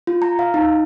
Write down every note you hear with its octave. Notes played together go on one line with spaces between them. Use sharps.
F4
A#5
F5
D#4